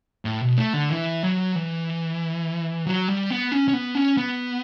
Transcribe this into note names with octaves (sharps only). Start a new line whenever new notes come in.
A2
B2
A3
D3
E3
F#3
E3
F#3
G3
B3
C#4
C#4
B3
C#4
B3